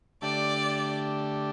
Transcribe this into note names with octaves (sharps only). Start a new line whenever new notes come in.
D3 A3 D4 G4 D5